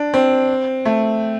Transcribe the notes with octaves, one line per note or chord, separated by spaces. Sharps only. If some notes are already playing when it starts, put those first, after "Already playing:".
Already playing: D4
C4
A3